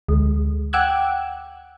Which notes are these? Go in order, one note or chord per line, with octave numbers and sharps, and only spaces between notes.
D2 G#3
F#5 G5 D6 E6 F#6 G#6